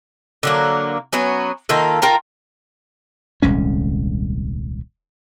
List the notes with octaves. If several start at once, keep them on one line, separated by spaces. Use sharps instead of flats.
D3 F#3 A#3
F#3 B3 C#4
D#3 A#3 F4 A4
F4 A#4 G5 A#5
D#1 C2 G#3 C#4